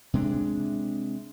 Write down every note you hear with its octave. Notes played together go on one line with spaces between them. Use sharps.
C3 G#3 A#3 D4